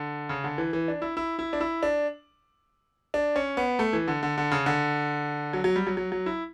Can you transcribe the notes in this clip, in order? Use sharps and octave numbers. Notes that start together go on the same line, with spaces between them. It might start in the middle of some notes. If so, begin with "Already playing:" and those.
Already playing: D3
C#3
D3
E3
E3
D4
E4
E4
E4
D4
E4
D4
D4
C#4
B3
A3
E3
D3
D3
D3
C#3
D3
F#3
F#3
G3
F#3
F#3
F#3
E4